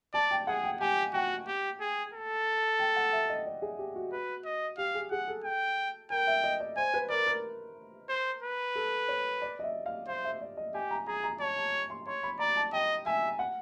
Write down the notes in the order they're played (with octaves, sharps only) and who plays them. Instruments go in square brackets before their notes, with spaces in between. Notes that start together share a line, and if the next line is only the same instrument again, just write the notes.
[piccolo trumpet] D5 [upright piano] A5
[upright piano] G5
[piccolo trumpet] G#4 [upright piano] F#5
[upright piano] G5
[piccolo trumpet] G4 [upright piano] G#5
[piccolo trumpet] F#4 [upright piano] G5
[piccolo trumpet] G4
G#4
A4
[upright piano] G5
F#5
E5
D#5
D5
G#4
G4
F#4
[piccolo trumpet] B4
D#5
[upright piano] G4 [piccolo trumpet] F5
[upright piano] G#4
[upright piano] G#4 [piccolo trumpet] F#5
[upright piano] A4
[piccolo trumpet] G5
[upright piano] A#4 [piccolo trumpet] G5
[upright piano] E5
D#5
D5
[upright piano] C5 [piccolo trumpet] G#5
[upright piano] B4
[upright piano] A#4 [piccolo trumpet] D5
[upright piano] A#4
[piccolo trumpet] C5
B4
[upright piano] A4
C#5
D5
D#5
E5
F5
[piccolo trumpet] C5 [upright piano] F5
[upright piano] E5
D5
D#5
[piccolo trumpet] G4 [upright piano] G#5
[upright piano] A#5
[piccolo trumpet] G#4 [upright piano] A#5
[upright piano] A#5
[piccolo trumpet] C#5 [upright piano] A5
[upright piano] A5
C6
[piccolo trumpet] C#5 [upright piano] C6
[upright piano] B5
[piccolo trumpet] D5 [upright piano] A#5
[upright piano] A5
[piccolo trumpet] D#5 [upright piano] G5
[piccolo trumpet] E5 [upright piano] G#5
[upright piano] F#5